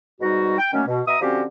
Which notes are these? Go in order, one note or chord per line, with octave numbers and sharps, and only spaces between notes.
G#2 B2 G3 D#4 F#4
G5
D#3 F#3 A3 A#3 C#4
B2
B2 E5 A#5 D#6
D3 F3 C4 C#4 F#4 G4